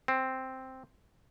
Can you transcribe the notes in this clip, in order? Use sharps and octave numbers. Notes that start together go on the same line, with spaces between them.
C4